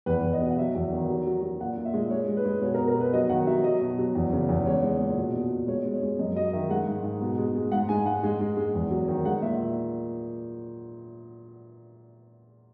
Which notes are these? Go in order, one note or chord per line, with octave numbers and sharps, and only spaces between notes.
E2 B4
E2
D#5
B2
F#5
F#3 E5
E2
D#3
F#3
F#3
F#3
A#2 F#5
A#2
E5
G#3
G#3 C#5
G#3
B4
G#3
B2 C#5
A#4
B2
A#4
B2 B4
F#3 D#5
D#3 F#5
F#3 E5
F#3 D#5
B2
F#3
E2
C#3
E2
G#3 C#5
G#3
A#2
B2
B2
B2
G#3 C#5
G#3
C#5
G#3
F#2 D#5
F#3 D#5
D#3 E5
G#3 F#5
G#2
G#2
B2
G#3
G#3
G#2 F#5
G#3 G#5
G#2 F#5
G#3
G#3
G#3
E2
F#3
D#3
G#3 F#5
A#2 E5